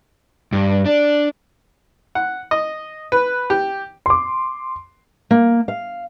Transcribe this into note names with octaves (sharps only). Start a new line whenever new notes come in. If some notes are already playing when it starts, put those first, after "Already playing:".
G2
D4
F#5
D#5
B4
G4
C6 D6
A#3
F5